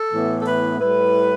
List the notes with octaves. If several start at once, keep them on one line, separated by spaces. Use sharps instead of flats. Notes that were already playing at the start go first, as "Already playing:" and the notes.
Already playing: A4
A2 E3 B3
A4
B4
A2 G3 E4 B4